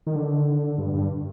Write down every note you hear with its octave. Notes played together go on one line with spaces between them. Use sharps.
D#3
D3
G2
G2